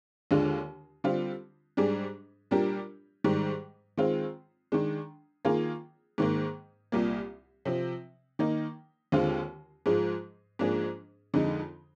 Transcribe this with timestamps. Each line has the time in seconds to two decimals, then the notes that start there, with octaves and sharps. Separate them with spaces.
0.31 D#2 D3 G#3 D4 F4
1.04 D3 G3 C4 F4
1.77 G#2 G3 D4 G#4
2.51 A#2 G3 D4 G4 A#4
3.24 G#2 D#3 G3
3.98 D#3 G#3 C4 F4
4.72 D#3 G#3 D4
5.45 D#3 A#3 F4 G#4
6.18 G#2 D#3 A#3
6.92 C2 A#2 G3 A#3
7.65 C3 F3 C4
8.39 D#3 A#3 D#4
9.12 D#2 D3 G#3 C4 F4
9.86 G#2 F3 G#3
10.59 G#2 F3 A#3 D4 G#4
11.34 F2 D3 G#3 D#4